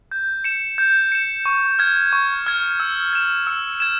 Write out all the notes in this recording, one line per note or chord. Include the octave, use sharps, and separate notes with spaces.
G6
C#7 E7
G6
C#7 E7
C#6
F6 G#6
C#6
F6 G#6
E6
G#6 E7
E6
G#6 E7